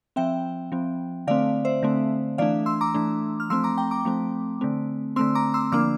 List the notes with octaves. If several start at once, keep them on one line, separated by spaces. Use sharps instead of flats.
F3 C4 E5 G5
F3 C4
D3 A3 C4 D5 F5
C5 E5
D3 A3 C4
E3 A3 D4 D5 F5
C6 E6
A#5 D6
E3 A3 D4
F6
F3 A3 C4 C6 E6
A#5 D6
G5 A#5
A#5 D6
F3 A3 C4
D3 A3 C4
D3 A3 C4 C6 E6
A#5 D6
C6 E6
D3 F3 A#3 D4 D6 F6